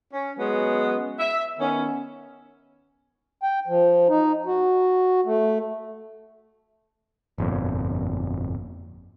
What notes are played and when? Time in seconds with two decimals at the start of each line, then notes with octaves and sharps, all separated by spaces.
0.13 C#4
0.39 F#3 G#3 B3 C#4
1.20 E5
1.59 D#3 B3 C#4
3.43 G5
3.67 F3
4.09 D#4
4.46 F#4
5.25 A3
7.38 G1 F2 A#2